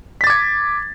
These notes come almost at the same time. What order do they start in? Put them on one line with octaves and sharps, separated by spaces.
B6 A6 D6 G#6